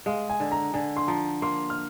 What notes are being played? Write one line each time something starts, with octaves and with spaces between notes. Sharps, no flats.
G#3 F5
G#5
D3
A#5
D3 G#5
C6
F3 A#5
A#3 C6
F6